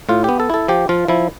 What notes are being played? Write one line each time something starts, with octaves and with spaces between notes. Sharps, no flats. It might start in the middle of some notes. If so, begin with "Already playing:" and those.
A2 F4
B3 G4
A4
E4 A4
F3 G4
F3 F4
F3 E4